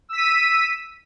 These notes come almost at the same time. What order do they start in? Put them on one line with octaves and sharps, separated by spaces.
E6 B6 D#7